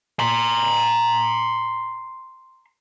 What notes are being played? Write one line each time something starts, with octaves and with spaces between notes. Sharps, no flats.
A#5 C6